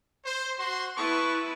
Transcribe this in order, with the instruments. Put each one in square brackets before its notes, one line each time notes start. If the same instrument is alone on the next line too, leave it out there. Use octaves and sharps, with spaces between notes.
[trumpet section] C5
F#4 C6
[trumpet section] B3 A5 C#6 [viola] E4 B4